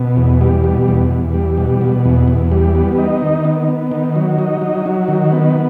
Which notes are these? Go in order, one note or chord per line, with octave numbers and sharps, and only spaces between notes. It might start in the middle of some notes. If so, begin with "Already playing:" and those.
Already playing: B2
E2
G3
B2
E2
E2
G3
B2
B2
E2
E2
G3
B3
D#4
D#3
B3
B3
D#3
F#3
D#4
F#3
F#3
D#3
B3